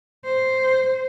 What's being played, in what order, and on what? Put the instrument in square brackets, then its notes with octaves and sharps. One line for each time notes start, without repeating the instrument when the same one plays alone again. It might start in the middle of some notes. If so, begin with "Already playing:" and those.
[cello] C5